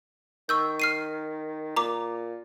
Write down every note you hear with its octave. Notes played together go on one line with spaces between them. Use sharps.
D#3 C#6 E6 G6
F6 C7 D#7
A#2 A#5 D6